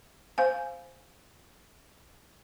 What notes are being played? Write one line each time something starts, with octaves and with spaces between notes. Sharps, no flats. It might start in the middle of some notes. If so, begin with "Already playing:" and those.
C5 F5 G#5